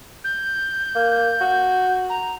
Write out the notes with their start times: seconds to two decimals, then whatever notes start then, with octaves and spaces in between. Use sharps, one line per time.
0.24 G6
0.95 A#3
1.41 F#4
2.09 A#5